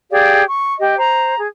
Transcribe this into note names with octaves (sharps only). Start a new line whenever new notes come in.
G4 G#4 D5 F5
C#6
G4 D#5
C5 A#5
G#4